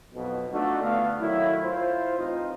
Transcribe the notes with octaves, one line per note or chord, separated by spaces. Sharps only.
B1 F2 B2
A3 D4 D#4 F4 F#4
D3 A3 B3 A4 D5 F5
D#3 F#3 A3 E4
E4 F4 C5
A1 C4 D#4 F4